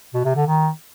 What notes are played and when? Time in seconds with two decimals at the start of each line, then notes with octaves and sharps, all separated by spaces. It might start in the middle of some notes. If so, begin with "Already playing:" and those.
0.14 B2
0.25 C3
0.36 D3
0.47 D#3